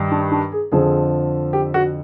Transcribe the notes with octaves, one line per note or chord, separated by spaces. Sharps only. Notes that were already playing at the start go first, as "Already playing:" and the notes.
Already playing: G2 D#3
D4
D4
G#4
F2 D3 F3 G#4
G4
F#4